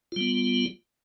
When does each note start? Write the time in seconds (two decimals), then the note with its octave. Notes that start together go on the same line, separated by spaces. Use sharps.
0.12 F4
0.16 G3
0.21 B3